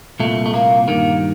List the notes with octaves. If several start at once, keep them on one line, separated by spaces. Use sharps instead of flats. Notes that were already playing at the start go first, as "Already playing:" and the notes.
C2 A#2 A3
A3
A#3
G2 D#3 A#3